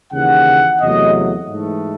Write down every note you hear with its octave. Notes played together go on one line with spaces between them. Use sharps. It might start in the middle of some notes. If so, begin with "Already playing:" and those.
D#2 C#3 E3 F#5
E2 C3 F#3 A3 D#5
G#2 E3 A3